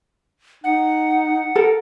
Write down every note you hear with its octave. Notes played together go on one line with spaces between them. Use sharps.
D#4 F#5
A4 A#4